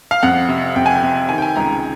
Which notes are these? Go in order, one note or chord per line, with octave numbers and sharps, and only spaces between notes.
F5
F2 F#5
C3
F2 G5
G#5
G5
C3
D#3 G#5
G5
G#5
C#2 A#5